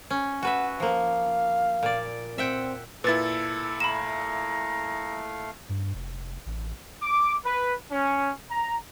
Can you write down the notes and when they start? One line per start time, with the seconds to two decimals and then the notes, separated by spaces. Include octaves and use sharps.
0.10 C#4
0.43 F#4 B4 E5 F#5
0.80 F3 A#3 F5
1.83 A#2 D5
2.38 C4 E5 F#5 G5
3.04 A#2 E4 A4 B4 A6
3.80 A3 F5 A#5 B5 E7
5.69 G2
5.94 F1
6.46 A1
7.02 D6
7.44 B4
7.91 C#4
8.49 A#5